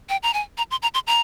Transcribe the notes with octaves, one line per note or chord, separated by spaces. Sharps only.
G5
A#5
G#5
A#5
C6
A#5
C6
A#5